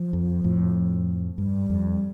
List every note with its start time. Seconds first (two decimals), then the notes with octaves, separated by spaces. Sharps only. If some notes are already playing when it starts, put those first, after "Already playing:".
Already playing: F3
0.13 F2
0.44 F2 A2
1.38 G2 G3
1.70 F2